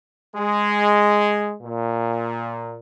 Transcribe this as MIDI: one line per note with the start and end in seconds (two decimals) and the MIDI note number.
0.34 1.53 56
1.62 2.79 46